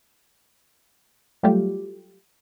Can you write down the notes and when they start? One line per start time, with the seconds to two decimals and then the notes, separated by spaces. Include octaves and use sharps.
1.43 F#3 G3 A3 F4 G4